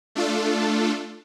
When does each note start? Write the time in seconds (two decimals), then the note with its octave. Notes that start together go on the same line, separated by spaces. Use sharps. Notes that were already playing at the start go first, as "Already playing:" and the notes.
0.15 A3 D4 F4 A4